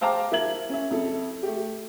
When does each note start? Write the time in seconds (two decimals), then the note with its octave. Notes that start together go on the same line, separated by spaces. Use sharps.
0.01 C5 F5 G5 A5 A#5 D6
0.32 E4 A#4 E5 G#6 F#7
0.69 C#4 E5
0.90 F2 E4 A4
1.43 A3 G4